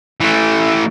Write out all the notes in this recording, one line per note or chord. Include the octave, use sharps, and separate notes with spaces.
E3 A3